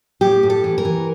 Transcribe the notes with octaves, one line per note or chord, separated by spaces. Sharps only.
A2 G4
A2
A4
E3
A#4
E3